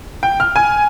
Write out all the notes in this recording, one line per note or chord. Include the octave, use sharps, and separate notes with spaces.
G5
F6
G#5